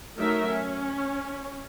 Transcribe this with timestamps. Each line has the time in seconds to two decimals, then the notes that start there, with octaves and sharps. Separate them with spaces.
0.18 F#3 A3 D#4 A#4 E5
0.48 C#4